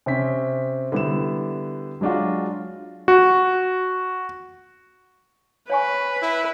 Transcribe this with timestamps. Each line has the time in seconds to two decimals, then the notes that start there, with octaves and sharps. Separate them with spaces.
0.06 C3 C4 C#4 B6
0.92 D3 G3 B3 E4 G4 E7
2.01 F#3 G#3 D4 F4 F#4
3.08 F#4
5.70 B4 C#5 G#5 C#6
6.22 E4